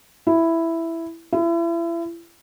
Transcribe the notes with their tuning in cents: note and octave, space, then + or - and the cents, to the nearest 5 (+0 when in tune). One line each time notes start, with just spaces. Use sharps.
E4 +5
E4 +35